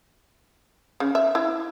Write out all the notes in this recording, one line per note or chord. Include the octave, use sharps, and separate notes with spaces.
C#3
E5
E4